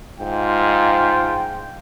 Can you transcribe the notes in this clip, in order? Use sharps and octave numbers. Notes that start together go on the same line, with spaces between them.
G#2 F4 G5